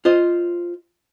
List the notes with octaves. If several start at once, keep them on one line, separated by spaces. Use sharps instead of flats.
F4 C5 D#5